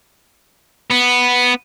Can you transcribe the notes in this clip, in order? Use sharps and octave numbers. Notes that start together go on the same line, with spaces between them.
B3